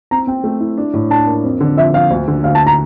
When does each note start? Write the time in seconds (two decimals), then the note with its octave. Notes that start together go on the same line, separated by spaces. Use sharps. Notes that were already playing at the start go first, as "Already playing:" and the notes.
0.11 C4 A#5
0.27 C4 G5
0.44 A3
0.60 E4
0.78 D4
0.94 A2
1.10 D4 A5
1.27 A#3
1.44 F2
1.60 D3
1.77 F3 E5
1.93 F3 F5
2.10 D2
2.28 D3
2.44 D2 F5
2.55 A5
2.67 A#5